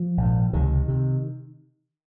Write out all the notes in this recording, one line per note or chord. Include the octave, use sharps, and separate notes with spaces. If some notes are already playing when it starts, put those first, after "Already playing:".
Already playing: F3
A#1 G#2
C#2 C3 D#3
C3